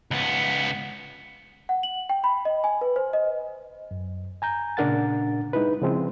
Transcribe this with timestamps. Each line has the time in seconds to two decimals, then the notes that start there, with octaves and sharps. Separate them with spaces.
0.11 C#2 B3
1.69 F#5
1.83 F#7
2.09 G5
2.24 B5
2.45 D#5
2.64 G#5
2.81 B4
2.96 C5
3.13 D#5
3.91 F#2
4.42 G#5 A#5 G6
4.77 A#2 C#3 D4 A#4 F#5 A6
5.53 G#3 D#4 E4 B4
5.81 C#3 F3 G#3 C4 E4